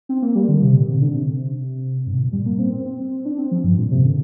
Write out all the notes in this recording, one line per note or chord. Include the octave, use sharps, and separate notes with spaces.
C4
A#3
G3
D3
C3
A#2
C3
D3
C3
G2
C3
A#2
G3
A#3
C4
C4
C4
D4
C4
F3
G2
A#2
C3
D3